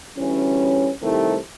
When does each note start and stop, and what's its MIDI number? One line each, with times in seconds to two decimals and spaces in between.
0.18 0.90 38
0.18 0.90 52
0.18 0.90 55
0.18 0.90 61
1.03 1.36 48
1.03 1.36 51
1.03 1.36 55
1.03 1.36 57
1.03 1.36 60
1.03 1.36 64